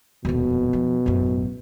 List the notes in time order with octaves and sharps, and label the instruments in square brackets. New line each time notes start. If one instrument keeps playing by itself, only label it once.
[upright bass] D#1 F2 [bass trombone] B2
[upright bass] F3
A1 F#2